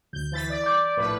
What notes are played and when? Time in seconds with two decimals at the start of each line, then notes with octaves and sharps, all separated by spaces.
0.13 D2 G6
0.31 E3 A6 B6
0.50 D5
0.64 D6 G6
0.96 A#1 A2 B4